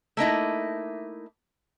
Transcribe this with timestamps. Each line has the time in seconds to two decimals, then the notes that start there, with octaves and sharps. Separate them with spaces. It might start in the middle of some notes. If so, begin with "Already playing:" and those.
0.17 A3 A#3 D#4 E4